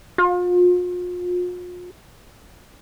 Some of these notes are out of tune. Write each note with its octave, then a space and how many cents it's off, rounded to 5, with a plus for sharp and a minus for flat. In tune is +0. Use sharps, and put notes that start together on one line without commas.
F4 +40